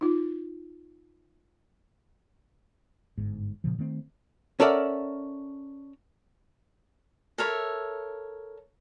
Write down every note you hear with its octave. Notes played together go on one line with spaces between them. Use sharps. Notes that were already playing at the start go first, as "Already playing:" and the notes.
D#4 F4
G1 G#2
A#2 C#3 F3
D#3 A3 C4
C#4 A4 A#4 D5 E5 F#5
A4 A#4 C#5 E5